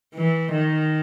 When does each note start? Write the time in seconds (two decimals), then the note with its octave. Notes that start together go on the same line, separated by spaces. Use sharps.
0.15 E3
0.52 D#3